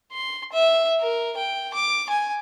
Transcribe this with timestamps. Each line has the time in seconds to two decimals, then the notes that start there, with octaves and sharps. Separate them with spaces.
0.12 C6
0.52 E5
1.00 A#4
1.37 G5
1.74 D6
2.09 G#5